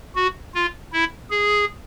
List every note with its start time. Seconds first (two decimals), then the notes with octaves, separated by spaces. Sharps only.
0.16 F#4
0.55 F4
0.93 E4
1.30 G#4